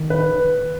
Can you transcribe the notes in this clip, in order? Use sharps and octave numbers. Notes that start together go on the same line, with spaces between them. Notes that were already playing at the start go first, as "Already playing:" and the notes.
Already playing: D#3
B4